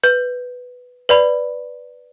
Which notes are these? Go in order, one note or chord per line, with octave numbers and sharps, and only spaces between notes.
B4 G6
B4 D5 B5